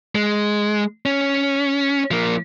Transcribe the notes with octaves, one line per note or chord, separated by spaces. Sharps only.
G#3
C#4
F3 A#3